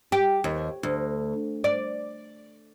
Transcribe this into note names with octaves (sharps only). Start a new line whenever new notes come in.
G4
D#2
D2
D5